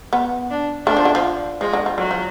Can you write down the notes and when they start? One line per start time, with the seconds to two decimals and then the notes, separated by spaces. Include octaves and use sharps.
0.13 B3
0.50 D4
0.86 A3 D4
0.97 F3
1.05 D3
1.15 F3
1.61 F3 G#3
1.73 D3
1.86 F3
1.98 D3 F#3
2.11 F3